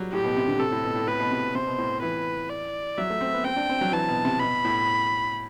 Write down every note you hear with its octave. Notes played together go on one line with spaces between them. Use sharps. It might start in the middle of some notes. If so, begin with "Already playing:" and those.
Already playing: F#3 G3
A2 G4
B2
C3
D3
C3 A4
A2
B2
A2
A2 B4
B2
C3
C3 C5
B2
A2
E3 B4
D5
F#3 E5
A3
C4
B3
C4 G5
D4
C4
F#3
E3 A5
B2
C3
B2 B5
A2